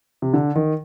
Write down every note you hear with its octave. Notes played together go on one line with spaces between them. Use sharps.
C3
D3
D#3